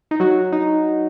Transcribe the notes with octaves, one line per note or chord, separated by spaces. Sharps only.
D#4
F#3 F#4
D#4